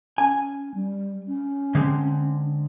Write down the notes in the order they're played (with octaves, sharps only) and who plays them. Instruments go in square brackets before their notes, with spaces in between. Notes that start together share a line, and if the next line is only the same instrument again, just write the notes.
[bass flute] C#4 [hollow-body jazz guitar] G#5
[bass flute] G3
C#4
[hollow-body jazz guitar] D3 G#3 C4